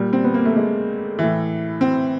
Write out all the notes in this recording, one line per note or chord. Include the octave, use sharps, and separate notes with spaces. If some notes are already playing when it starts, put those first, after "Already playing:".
Already playing: A#2 G3
C4
B3
A#3
A3
G#3
A2 E3
C4